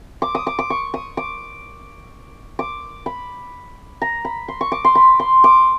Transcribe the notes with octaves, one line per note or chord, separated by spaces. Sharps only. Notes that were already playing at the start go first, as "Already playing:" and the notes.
D6
D#6
D6
D6
C#6
D#6
D6
D6
B5
A#5
B5
C6
C#6
D6
C6
B5
C6
D6